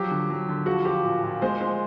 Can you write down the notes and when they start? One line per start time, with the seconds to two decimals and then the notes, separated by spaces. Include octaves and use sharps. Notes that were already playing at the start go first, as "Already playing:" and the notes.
Already playing: F3 F#3 G4
0.11 D3
0.30 F#3
0.48 D3
0.66 F3 F#4
0.85 F3 G4
1.04 A#2
1.23 A#2
1.42 G#3 C5
1.61 G#3